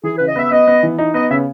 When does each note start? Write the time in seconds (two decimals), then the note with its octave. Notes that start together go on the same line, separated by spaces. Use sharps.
0.03 E3 G#4
0.16 B4
0.20 C#3
0.28 D#5
0.36 B3 E5
0.51 B3 D#5
0.67 B3
0.83 E3
0.98 D#4
1.14 B3 D#5
1.30 C#3 E5